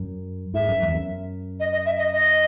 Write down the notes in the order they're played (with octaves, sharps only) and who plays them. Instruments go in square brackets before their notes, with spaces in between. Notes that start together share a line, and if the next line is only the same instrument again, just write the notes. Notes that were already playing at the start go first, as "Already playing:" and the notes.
Already playing: [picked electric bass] F#2
[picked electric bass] G#2 [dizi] E5
[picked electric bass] F#2
E2
F#2
[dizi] D#5
D#5
E5
D#5
D#5